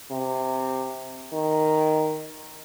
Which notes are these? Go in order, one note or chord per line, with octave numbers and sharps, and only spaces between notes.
C3
D#3